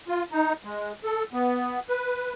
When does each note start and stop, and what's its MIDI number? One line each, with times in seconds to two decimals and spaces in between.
0.08 0.23 65
0.32 0.53 63
0.64 0.93 56
1.04 1.24 69
1.33 1.80 59
1.89 2.33 71